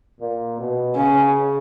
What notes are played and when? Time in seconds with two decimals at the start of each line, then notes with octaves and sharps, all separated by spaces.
0.20 A#2
0.58 B2
0.96 C#3 C#4